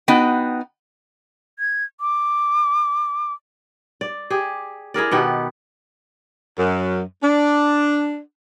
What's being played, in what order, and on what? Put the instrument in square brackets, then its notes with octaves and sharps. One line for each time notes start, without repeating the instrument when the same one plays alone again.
[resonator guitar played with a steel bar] B3 D#4 F#4 G5
[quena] G#6
D6
[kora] D5
G4 G#4
E4 G#4 A#4 D5
B2 D#3 B3 G4
[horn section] F#2
D4